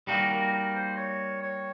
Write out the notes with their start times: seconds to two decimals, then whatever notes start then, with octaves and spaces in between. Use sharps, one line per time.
0.07 G3 A#3 D#4 F#4 A#4
0.30 A#4
0.52 A#4
0.75 C5
0.97 C#5
1.42 C#5